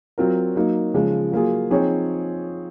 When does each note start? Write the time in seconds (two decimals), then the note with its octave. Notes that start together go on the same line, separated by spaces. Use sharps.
0.18 F#3 C4 F4 A#4
0.56 F#3 A#3 D#4
0.94 C#3 F3 G#3
1.32 F#3 A#3 F4 G#4
1.71 F3 C4 D#4 G#4 C#5